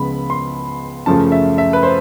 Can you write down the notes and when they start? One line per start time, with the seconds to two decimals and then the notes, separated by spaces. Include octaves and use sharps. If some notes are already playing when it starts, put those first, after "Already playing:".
Already playing: C#2 C#3 F3 G#3 B3 B5
0.30 C6
1.06 F#2 C#3 F3 A3 A5
1.32 E5
1.58 E5
1.73 B4
1.83 C5